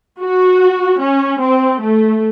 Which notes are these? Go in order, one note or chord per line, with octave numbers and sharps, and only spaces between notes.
F#4
C#4
C4
A3